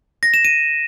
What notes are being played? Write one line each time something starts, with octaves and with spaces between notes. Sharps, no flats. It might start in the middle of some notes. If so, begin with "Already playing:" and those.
A#6
E7
D#7